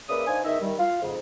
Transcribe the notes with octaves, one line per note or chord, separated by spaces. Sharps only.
C#3 A#3 B4 D5 E5 D#6
D4 D#4 C5 F5 G#5
E2 D#3 D#4 E5
D#3 G3
F4 F5
F2 G#2 C#3